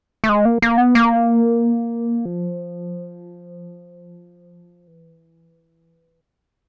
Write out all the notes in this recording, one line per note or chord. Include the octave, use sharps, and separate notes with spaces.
A3
G#3
A#3
A#3
B3
A#3
F3
E3